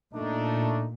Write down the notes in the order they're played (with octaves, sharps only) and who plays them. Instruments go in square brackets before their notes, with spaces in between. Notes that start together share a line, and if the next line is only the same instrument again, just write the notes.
[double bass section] A#2 [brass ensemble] A3 D4 D#4